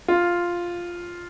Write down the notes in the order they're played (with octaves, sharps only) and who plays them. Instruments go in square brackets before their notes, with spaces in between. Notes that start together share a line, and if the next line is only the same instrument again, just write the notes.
[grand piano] F4